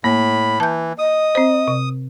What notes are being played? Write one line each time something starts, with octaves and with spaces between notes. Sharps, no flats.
A2 A#3 B5
E3 A5 G6
D#5 D#6
C4 C5
C3